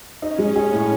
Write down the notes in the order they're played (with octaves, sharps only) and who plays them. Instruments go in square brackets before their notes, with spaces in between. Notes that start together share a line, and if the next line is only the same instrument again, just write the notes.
[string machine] C#4 [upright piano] D#4
[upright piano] G#3
[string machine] C#4 [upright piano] G#4
[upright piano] A2